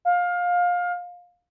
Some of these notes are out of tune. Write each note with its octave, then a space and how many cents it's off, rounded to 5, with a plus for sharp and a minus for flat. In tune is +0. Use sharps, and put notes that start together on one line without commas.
F5 +20